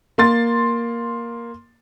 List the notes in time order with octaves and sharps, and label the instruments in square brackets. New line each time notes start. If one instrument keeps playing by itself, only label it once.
[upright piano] A#3 C6 A6